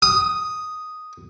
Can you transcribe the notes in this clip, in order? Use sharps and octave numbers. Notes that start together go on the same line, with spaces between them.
D#6